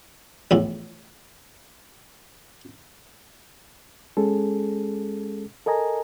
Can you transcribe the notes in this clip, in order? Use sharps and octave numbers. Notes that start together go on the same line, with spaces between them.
A#1 E2 A2
G#3 C#4 G#4 A4
A4 A#4 D#5 G#5 A#5